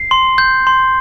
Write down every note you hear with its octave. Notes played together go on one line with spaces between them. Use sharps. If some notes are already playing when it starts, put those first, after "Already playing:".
Already playing: C7
C6
G6
C6